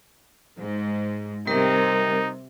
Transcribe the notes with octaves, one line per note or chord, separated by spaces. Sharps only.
G#2
C3 G3 D#4 A#4